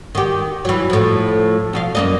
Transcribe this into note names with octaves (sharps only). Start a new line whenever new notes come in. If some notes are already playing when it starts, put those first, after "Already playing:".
D#3 G4
E3 F#3
A2 F3
B2 F3 F5
F#2 A#3 D#5